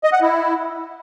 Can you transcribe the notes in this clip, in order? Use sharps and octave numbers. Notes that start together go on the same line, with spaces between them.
D#5
F#5
E4